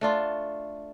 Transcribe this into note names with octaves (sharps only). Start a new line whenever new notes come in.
A3 D4 F4